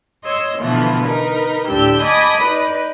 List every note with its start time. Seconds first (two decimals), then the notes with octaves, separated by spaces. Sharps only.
0.24 C#5 D#5 C6 E6
0.58 B2 D3 E3 F3 A3 B3
1.04 D#4 A#4 B4
1.68 D2 A2 D4 G4 E6 G6
2.01 D#5 G#5 A5 B5 D6 D#6
2.40 D#4 B4 D5